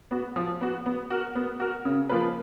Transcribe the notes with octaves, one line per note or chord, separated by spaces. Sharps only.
B3 F#4
F3
B3 F#4
B3
F#4 A#4
B3
F#4 A#4
C#3
F3 A#3 F4 B4